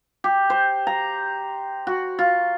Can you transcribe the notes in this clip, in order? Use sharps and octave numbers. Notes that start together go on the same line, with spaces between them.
G4
C5
A#5
F#4
F4